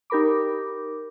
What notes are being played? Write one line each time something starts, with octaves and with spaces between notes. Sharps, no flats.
D#4 G4 A#4 B5 D6